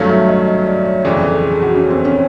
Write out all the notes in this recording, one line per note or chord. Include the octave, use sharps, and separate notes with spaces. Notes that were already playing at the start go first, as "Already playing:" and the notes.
Already playing: G2 D#3 F#3 A3 C#4 F5
E5
D#5
D#5
D5
C#5
G1 F2 C#3 E3 D5
A4
G#4
F#4
C#4
C4
C#4